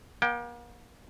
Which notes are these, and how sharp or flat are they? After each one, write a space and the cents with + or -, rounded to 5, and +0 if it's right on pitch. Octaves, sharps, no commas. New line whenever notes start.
A#3 +40 G5 +0